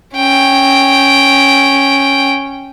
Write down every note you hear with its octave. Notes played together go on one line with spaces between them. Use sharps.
C#4 G5